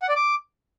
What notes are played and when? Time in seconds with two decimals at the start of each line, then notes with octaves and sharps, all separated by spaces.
0.02 F#5
0.09 D5
0.16 D6